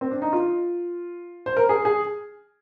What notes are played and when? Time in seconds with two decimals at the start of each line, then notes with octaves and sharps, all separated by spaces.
0.01 C4
0.11 D4
0.22 D#4
0.33 F4
1.46 C5
1.57 A#4
1.69 G#4
1.85 G#4